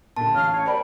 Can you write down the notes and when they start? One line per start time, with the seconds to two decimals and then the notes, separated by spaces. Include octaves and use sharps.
0.16 A#2 D3 A5
0.34 A1 C#4 F5 F6
0.52 C#5
0.66 A#4 C5 D5 G5 B5